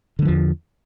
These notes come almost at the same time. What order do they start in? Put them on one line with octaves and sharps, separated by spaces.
D3 G3 F3 E2